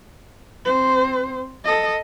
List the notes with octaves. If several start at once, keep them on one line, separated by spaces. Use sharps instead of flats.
C4 C5
A4 D#5